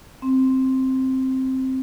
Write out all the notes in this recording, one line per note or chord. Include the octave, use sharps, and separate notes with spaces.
C4